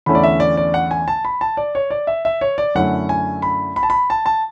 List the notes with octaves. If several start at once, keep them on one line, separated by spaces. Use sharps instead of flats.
E2 D3 A3 C#4 E4 B5
D5
E5
D5
D5
F#5
G#5
A5
B5
A5
D5
C#5
D5
E5
E5
C#5
D5
F#2 D3 A3 C#4 E4 F#5
G#5
B5
B5
A5
B5
A5
A5